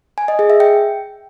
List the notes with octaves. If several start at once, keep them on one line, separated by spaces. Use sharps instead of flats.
G#5
D#5
G#4
E5
G5